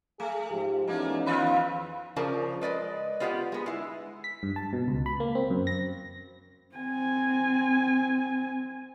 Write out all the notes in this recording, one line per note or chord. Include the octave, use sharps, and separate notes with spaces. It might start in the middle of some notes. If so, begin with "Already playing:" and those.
A3 G#4
G#2 F3 G4
E2 A3 A#3 C#4 D#4
D#3 F4 B4
C#3 F3 A#4 D5 A5
G#3 B4 D5 D#5
B3 F4 G4 C#5 D5 F#5
G#3 B3
G#3 E4
B6
G2
A5
B2
C#2
B5
A#3
C4
F#2
A#6
C4 G#5